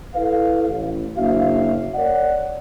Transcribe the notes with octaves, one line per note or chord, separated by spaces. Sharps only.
E4 A4 B4 F5
A1
F#1 A#3 D4 F#4 E5 F5
A#4 C#5 D5 F#5